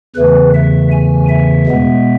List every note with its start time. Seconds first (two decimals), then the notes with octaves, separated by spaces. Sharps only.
0.16 E2 C#3 E3 A3 B4
0.54 E5
0.92 G#5
1.29 E5
1.67 B2 G#3 B3